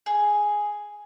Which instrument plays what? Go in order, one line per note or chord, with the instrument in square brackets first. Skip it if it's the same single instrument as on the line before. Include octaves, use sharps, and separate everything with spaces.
[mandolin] G#4